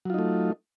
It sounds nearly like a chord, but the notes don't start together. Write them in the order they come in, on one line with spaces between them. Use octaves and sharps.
F#3 F4 D#4 A3